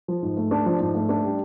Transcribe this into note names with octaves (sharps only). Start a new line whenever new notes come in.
F3
G#2
A3
D4
F3
G#2
A3
D4
G3